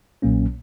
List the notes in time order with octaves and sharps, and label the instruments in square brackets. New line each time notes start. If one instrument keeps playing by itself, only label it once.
[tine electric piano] B1 A#2 F#3 A#3 C#4